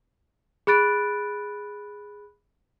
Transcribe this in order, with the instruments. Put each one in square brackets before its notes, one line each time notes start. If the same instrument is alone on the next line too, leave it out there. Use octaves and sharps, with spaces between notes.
[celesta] G#4 B5 F#6 A6 D7